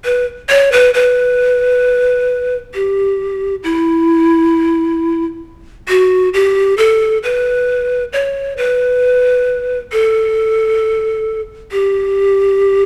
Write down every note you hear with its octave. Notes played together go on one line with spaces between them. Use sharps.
B4
C#5
B4
B4
G4
E4
F#4
G4
A4
B4
C#5
B4
A4
G4